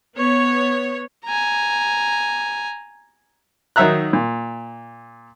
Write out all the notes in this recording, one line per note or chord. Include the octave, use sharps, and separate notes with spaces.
B3 C#5
G#5 A#5
D#3 F#3 D#4 E5 A#5 F#6
A#2